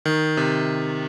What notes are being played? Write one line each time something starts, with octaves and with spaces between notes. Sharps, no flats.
D#3
C3